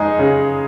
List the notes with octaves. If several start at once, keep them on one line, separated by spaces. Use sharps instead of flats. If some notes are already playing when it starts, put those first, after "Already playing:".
Already playing: G#3 D#4 G#4
C#3